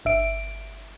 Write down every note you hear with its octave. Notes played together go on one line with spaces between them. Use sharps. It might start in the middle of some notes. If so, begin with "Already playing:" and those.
G1 E5 D7